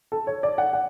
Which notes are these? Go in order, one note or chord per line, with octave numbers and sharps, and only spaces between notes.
A4
C#5
D5
F#5
F#5